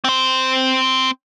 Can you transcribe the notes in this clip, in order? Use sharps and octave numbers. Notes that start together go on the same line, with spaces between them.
C4 C5